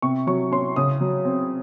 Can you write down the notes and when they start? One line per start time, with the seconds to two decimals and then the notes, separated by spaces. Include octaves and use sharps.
0.02 C3 C#6
0.27 F#3 C#6
0.52 C#4 C6
0.76 C#3 D#6
1.00 F#3
1.25 C4